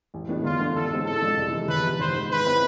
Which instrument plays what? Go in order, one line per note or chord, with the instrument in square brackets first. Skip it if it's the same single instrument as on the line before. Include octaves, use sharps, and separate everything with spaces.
[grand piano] A1
A2 G#3 B3 D4
[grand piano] E2 [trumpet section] F4
[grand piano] D3 A3 D4
[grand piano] A1 [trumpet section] A4
[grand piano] G#2 G#3 C4
[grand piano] A2 [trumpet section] A4
[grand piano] F3 G#3 D4
C2
C3 E3 G#3
[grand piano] E2 [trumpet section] B4
[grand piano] C3 F3
[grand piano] G#1 [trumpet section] C5
[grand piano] G#2 G#3
[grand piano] G#2 [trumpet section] B4
[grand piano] G#3 C4 E4